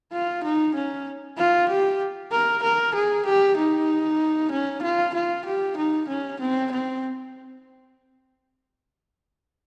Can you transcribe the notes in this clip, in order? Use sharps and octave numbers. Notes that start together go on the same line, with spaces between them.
F4
D#4
C#4
F4
G4
A#4
A#4
G#4
G4
D#4
C#4
F4
F4
G4
D#4
C#4
C4
C4